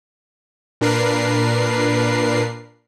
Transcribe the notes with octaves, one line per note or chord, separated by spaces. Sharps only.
A#2 D4 A#4 B4 C7